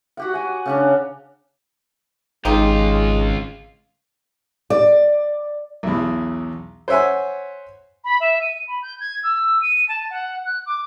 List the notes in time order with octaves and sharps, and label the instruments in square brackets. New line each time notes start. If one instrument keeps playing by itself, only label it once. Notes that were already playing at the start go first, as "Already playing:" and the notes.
[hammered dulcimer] F#4 G4 F#5
F#4 G#5
C#3 C#4 D4
[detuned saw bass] G#1 [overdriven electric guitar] C#2 F4 [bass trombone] G#3 [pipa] D#4 G4
[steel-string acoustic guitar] D5
[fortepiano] B1 E2
C5 C#5 E5 F#5 G#5
[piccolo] B5
E5
D#7
B5
G6
G#6
E6
D#7
A5
F#5
F#6
D6